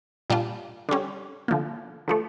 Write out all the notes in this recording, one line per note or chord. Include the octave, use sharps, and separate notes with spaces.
A#2 G3 D4 F4
D3 G3 C#4
D3 F3 A#3
D3 F3 A3